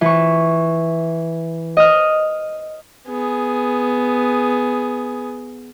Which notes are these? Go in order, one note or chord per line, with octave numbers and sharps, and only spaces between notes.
E3 C#6
D#5 F6
B3 G#4